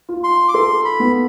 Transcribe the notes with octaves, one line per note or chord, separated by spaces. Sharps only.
F4
C6
D6
A4 C6
B5
B3